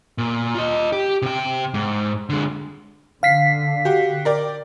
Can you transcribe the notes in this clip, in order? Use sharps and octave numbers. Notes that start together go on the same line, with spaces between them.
A#2
F4 D#5
G4
C3 G5
G#2
D3 G#3
D3 F5 B6 C7
F#4 G4
A#4 D5 G5